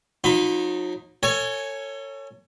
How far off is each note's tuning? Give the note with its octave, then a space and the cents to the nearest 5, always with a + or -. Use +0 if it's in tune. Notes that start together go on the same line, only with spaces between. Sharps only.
F#3 -45 D#4 +0 B5 +30
A4 +35 C#5 +0 G#5 +15